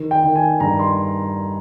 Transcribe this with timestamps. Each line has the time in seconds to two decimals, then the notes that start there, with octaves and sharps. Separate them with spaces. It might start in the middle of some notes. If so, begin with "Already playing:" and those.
Already playing: D#3
0.11 G5
0.24 D#3
0.36 G#5
0.60 G2 A#5
0.79 C6